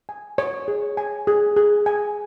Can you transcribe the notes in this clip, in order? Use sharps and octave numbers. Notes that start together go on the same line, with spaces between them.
G#5
C#5
G#4
G#5
G#4
G#4
G#5